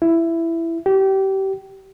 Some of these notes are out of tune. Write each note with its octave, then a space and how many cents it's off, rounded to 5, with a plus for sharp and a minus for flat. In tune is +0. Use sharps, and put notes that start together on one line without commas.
E4 +10
G4 -25